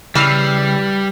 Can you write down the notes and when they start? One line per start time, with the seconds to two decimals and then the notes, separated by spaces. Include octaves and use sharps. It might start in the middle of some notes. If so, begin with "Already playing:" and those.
0.15 C#3 E3 G3 E6 F6 C7